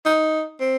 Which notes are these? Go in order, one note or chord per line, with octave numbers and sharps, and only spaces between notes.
D#4
C4